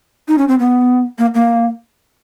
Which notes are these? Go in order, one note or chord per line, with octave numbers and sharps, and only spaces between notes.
D#4
C#4
C4
B3
A#3
A#3